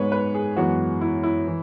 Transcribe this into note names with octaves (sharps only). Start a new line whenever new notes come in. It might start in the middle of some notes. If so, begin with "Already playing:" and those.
Already playing: G#2 G#3 B3 B4 C#5
B4
G#4
F#2 E3 G#3 B3 F#4
E4
E4
E3